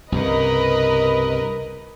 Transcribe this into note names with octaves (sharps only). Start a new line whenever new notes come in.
C2 G2 C#3 A#4 B4 D#5